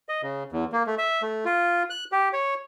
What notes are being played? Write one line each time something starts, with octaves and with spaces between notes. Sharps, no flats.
D#5
C#3
E2
A#3
A3
E5
A3
F4
F#6
G4
C#5